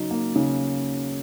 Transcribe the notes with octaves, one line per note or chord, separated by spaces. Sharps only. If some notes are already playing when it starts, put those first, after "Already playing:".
Already playing: C#3 F#3 D#4
A#3
C#3